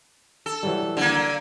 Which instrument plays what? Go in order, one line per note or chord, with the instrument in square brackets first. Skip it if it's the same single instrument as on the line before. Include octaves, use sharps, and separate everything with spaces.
[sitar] A4
[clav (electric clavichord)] E3 F#3 G3
[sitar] D3 A#3